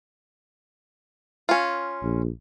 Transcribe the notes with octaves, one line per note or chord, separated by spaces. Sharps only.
C#4 F4
A#1